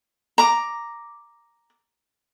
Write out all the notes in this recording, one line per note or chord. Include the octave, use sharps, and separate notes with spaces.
A#5 D6